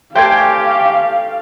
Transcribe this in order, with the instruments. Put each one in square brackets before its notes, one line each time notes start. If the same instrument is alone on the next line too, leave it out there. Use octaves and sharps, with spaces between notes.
[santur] A3 G5 [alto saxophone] G4 [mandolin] C5 D5 G#5 [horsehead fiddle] F5